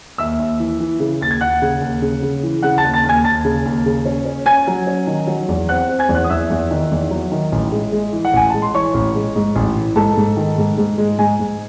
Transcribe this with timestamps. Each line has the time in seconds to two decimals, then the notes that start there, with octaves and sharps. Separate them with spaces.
0.18 D#2 E5 E6
0.39 D#2
0.60 E3
0.80 E3
1.00 C#3
1.21 D#2 A6
1.31 G#6
1.41 D#2 F#5 F#6
1.62 C#3
1.81 D#2
2.02 C#3
2.22 C#3
2.43 E3
2.63 C#3 F#5 F#6
2.78 A5 A6
2.84 D#2
2.94 A5 A6
3.03 D#2
3.09 G#5 G#6
3.24 D#2 A5 A6
3.45 C#3
3.66 D#2
3.86 C#3
4.06 C#4
4.25 C#4
4.46 C#4 G#5 G#6
4.67 F#3
4.87 C#4
5.07 D#3
5.27 F#3
5.48 E2
5.69 C4 F#5 F#6
5.89 C4
5.99 G#5 G#6
6.09 E2
6.15 F#5 F#6
6.24 D#6
6.29 E2 E5 E6
6.50 E2
6.71 D#3
6.91 E2
7.11 F#3
7.32 D#3
7.52 A1
7.72 G#3
7.92 G#3
8.13 E3
8.25 F#5
8.34 A1 G#5
8.50 G#3 A5
8.62 C6
8.74 E3 C#5 C#6
8.94 A1
9.15 G#3
9.36 G#2
9.56 A1
9.76 E3
9.96 G#2 A4 A5
10.17 G#2
10.37 D#3
10.58 G#2
10.78 G#2
10.98 G#3
11.19 G#2 G#4 G#5
11.40 G#2